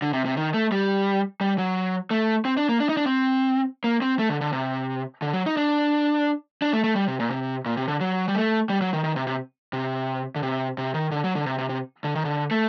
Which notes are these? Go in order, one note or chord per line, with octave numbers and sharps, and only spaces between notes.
D3
C3
C3
D#3
A3
G3
G3
F#3
A3
C4
D4
A#3
D4
D#4
D4
C4
A#3
C4
A3
D3
D3
C3
D3
F#3
D#4
D4
D4
A3
A3
G3
C3
A#2
C3
A#2
C3
D3
F#3
G3
A3
G3
F#3
D#3
D#3
C3
C3
C3
D3
C3
C3
D#3
D3
F#3
D3
C3
C3
C3
D3
D#3
D3
A3